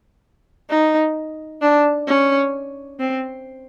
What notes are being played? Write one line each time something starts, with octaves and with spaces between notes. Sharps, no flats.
D#4
D4
C#4
C4